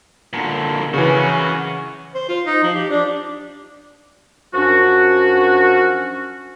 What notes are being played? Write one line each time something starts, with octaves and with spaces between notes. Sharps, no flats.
A#2 D3
C#3 E3 C#4 F#4
C5
F4
D#4
F3
G4
D4
F#2 F3 C#4 D4 F#4